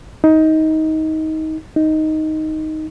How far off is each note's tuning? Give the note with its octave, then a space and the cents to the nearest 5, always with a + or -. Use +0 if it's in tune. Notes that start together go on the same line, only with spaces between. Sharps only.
D#4 +20
D#4 +5